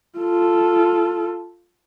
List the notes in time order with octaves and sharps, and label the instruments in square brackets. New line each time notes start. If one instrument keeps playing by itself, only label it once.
[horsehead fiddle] F4 A4